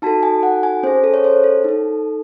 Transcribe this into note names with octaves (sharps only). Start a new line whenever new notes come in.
D#4 F#4 A4 A5
G#5
F#5
G#5
C#4 G#4 C5
A4
C#5
C5
A4
D#4 A4